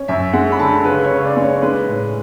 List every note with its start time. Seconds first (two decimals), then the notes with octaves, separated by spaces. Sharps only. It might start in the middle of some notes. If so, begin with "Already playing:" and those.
Already playing: C#4
0.08 F#2 E5
0.33 G#3 F#5
0.52 B5
0.59 D3 A5
0.85 C#3 B4
1.04 C#5
1.11 C#3
1.24 D5
1.37 G#3
1.43 C#5
1.62 G#3 B4
1.87 A2